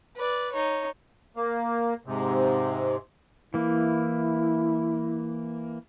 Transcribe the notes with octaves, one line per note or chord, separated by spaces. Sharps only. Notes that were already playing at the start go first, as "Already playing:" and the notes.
B4 D5
D#4 C#5
A#3
G#2 C3
E3 A#3 E4